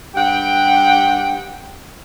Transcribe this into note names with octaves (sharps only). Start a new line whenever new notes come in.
G2 G4 F#5 G5